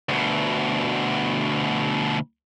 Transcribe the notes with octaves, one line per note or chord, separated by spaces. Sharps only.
D2 B2